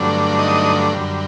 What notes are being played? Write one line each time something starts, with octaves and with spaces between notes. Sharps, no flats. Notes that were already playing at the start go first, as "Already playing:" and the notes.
Already playing: G2 D3 F#3 A3 D4
D#4 D#5
F#2 D3 G3